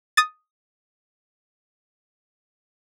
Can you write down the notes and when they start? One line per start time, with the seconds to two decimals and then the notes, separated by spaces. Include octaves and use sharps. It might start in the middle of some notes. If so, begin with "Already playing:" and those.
0.17 D#6 A6